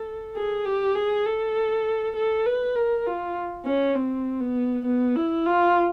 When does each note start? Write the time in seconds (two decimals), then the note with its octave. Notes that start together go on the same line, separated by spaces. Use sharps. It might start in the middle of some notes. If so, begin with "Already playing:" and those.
Already playing: A4
0.36 G#4
0.65 G4
0.95 G#4
1.26 A4
2.16 A4
2.46 B4
2.75 A#4
3.06 F4
3.66 C#4
3.95 C4
4.41 B3
4.85 B3
5.16 E4
5.46 F4